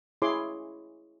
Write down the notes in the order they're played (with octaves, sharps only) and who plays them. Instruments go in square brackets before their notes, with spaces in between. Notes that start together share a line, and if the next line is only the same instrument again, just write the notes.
[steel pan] E4 G#4 C#5 C6 D6